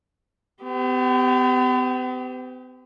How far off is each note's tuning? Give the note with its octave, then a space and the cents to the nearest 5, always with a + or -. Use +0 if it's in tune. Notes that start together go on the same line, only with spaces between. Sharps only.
B3 +45 G4 +0